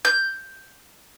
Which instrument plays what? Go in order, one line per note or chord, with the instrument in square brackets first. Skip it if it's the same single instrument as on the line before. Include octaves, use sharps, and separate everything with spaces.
[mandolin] G6